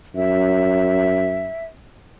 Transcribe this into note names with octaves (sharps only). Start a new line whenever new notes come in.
F#2 E5